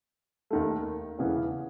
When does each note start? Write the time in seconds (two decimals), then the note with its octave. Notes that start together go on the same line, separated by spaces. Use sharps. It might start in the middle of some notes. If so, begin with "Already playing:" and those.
0.50 D#2 D#3 A3
1.18 E2 C#3 E3 B3